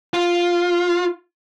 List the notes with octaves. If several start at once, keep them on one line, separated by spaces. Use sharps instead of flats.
F4